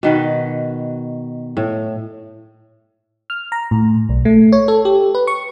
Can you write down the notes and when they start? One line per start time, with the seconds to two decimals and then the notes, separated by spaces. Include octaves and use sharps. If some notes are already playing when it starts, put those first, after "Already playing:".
0.03 B2 D#3 B4
1.57 A2
3.30 F6
3.52 A#5
3.71 A2
4.09 B1
4.25 A3
4.52 C#5
4.68 A4
4.85 G4
5.15 B4
5.27 C#6